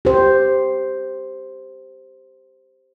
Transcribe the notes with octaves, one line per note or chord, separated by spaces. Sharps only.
G4 C5